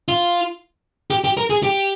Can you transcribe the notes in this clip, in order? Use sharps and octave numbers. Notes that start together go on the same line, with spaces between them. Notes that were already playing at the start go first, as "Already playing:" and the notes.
F4
G4
G4
A#4
G#4
G4